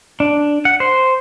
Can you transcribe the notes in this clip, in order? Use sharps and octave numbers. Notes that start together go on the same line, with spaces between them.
D4
F#5
C5